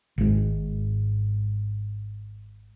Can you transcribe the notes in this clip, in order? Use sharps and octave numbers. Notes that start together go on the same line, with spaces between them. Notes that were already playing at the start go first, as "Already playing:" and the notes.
G#1 G#2